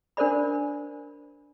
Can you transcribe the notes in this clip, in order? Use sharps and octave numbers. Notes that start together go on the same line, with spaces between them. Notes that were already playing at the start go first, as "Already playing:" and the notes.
D4 A#4 C5 D5 B5